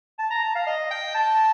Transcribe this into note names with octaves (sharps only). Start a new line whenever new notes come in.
A5
A#5
A5
F5
D#5
G5
A5